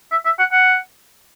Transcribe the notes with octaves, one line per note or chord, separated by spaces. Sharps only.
E5
E5
F#5
F#5